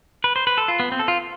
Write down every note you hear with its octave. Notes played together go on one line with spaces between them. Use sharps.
B4
C5
B4
A4
F4
B3
C4
A4
F4